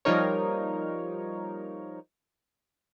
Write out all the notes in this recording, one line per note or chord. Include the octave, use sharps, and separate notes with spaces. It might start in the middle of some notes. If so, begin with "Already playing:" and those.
F3 G3 A#3 D#4 A#4 C#5